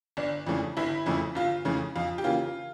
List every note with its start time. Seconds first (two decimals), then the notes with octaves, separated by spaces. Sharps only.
0.17 G1 D4
0.47 F2 C#3 E3 A3
0.77 G1 E4
1.06 F2 C#3 E3 A3
1.35 G1 F4
1.65 F2 C#3 E3 A3
1.95 F2 F4
2.18 G4
2.24 C#3 E3 A#3 F4